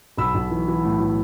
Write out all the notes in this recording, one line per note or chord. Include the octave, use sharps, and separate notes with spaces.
B1 B5 E6
B1
E3
E3
A2
E3